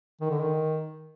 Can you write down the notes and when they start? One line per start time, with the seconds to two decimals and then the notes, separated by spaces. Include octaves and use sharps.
0.21 D#3
0.30 D3
0.39 D#3